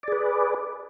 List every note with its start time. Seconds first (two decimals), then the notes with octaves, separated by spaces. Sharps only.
0.03 D5
0.08 G#4
0.12 B4